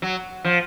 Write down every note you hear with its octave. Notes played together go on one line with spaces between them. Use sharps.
F#3
F3